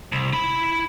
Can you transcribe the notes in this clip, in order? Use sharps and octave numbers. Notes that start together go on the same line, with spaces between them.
C2
E4 B5